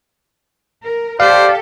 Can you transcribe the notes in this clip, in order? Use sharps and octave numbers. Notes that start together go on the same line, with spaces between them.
A#4
G4 A4 C5 D5 F5